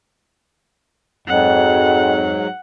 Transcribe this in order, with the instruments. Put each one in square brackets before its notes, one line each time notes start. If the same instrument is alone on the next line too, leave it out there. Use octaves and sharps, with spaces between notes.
[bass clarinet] F2 [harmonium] G#2 F#3 [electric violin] F#5